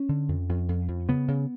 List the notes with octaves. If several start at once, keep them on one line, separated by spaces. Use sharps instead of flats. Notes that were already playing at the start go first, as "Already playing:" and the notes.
Already playing: C#4
D3
F2
F2
F2
F2
C#3 B3
C#3